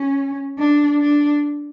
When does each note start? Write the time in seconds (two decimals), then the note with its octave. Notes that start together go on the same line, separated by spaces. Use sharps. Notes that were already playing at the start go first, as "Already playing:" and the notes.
Already playing: C#4
0.58 D4
1.00 D4